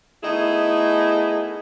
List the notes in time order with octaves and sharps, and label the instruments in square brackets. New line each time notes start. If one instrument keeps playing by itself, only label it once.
[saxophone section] A3 B3 D#4 E4 G#4